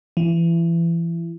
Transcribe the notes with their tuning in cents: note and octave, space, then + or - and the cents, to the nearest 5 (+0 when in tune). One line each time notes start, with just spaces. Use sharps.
E3 +30